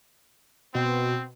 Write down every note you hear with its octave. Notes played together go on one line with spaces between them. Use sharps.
B2 C4